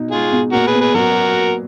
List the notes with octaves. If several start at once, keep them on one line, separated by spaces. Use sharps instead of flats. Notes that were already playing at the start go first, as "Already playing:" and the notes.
Already playing: B2 D#4
G#3 F4 G#4
B2
A#2 F#4 A#4
G#4 B4
B3
G#4 B4
F#3 F#4 A#4